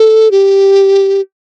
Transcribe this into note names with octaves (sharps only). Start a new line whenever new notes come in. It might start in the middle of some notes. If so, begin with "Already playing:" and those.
Already playing: A4
G4